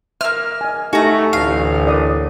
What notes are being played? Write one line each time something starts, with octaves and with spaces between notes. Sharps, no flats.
A#3 E5 F6
D#5 G#5
A3 D#4 F#4 G4 G#5 A#5
A1 D2 F5
A#4 D5 D#6